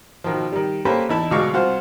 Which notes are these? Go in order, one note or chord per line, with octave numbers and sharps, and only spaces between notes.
B2 D#3 F3
D#3 G3
A#3 C#4 G4 A4 B4 C5
E2 D#4 E4 A5 B5
D2 B2 G#3 F5 C#6 D6
C2 F4 F#4 C5